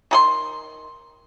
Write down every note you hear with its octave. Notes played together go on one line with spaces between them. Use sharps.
D#3 G#4 C6